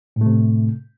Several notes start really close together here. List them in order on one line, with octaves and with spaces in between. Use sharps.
A2 A3 C3